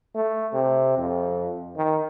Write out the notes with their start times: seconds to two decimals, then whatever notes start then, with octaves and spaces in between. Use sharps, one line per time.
0.15 A3
0.53 C3
0.98 F2
1.77 D#3